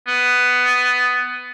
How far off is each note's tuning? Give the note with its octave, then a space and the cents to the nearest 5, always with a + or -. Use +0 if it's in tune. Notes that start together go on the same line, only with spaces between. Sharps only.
B3 +10